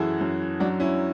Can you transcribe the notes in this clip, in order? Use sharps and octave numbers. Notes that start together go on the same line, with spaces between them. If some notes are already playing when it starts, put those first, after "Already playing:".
Already playing: F#2 E3 E4 F#4 G#4 A4
F#2
F#3 D4 F#4
C#4 E4